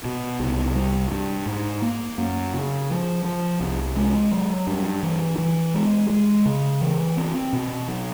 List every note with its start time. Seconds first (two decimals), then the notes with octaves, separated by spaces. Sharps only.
0.05 B2
0.40 C2
0.75 G3
1.11 G2
1.46 G#2
1.82 A#3
2.18 F#2
2.54 C#3
2.90 F3
3.25 F3
3.60 C2
3.96 G#3
4.31 F#3
4.67 G2
5.03 E3
5.38 E3
5.74 G#3
6.10 G#3
6.46 C#3
6.81 E3
7.17 C4
7.53 B2
7.88 F#3